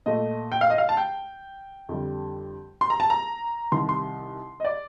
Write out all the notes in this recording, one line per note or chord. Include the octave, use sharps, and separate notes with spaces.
A#2 A3 D#5
G5
F5
D#5
F5
A5
G5
F2 D3 G3
C6
A#5
A5
A#5
C2 C3 D#3 C6
C6
D#5
D5